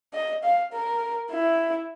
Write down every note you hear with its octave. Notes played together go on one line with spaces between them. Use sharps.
D#5
F5
A#4
E4